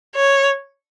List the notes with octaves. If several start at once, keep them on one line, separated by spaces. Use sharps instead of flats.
C#5